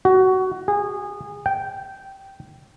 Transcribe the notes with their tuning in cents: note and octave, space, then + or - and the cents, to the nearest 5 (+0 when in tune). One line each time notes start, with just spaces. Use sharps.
F#4 +20
G#4 -25
G5 -10